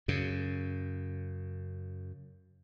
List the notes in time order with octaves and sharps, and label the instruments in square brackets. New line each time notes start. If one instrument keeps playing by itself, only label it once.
[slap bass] F#2 C#3